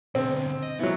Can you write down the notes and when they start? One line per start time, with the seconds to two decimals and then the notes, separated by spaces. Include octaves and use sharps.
0.15 B2 D3 C4
0.63 D#5
0.79 E3 F#3 B3